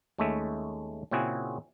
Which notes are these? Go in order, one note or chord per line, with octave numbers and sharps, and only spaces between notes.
D#2 G#3 A3 C#4 E5
A#2 C#3 C4 E4 F#4 G#4